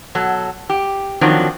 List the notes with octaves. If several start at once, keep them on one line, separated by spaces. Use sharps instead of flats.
B2 F#3 A4
G4
D3 D#3 F3 F#3 C4 D4